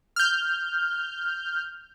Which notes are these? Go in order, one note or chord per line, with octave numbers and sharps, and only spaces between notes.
F6 G6